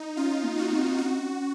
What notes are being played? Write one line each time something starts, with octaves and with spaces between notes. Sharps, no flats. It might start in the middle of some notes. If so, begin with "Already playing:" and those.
Already playing: D#4
C#4 F4
A#3
F#4
C4
C#4 F#4
C4
C#4